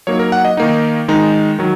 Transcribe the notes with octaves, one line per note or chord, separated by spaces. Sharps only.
F#3 A#3 D#4 C#5
A#4
F#5
D#5
D#3 A#3 D#4
D#3 G#3 D#4
D#3 F#3